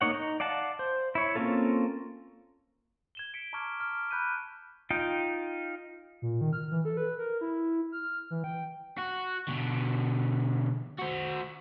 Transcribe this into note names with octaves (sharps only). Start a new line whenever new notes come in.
A#3 D#4 C#5 F#5
D#4
D5 F5 F#5 A5
C5
E4 C#5
A#3 C4 C#4 F4 A4
G#6 E7 G7
B6 C#7 D7
A5 A#5 C#6 D6 F6 G#6
F6
B5 F#6 G6 B6 D#7
D#4 F4 G5
A#2
D#3
F6
E3
A4
B4
A#4
E4
F6
E3
G5
F#4
B2 D3
F#4 C5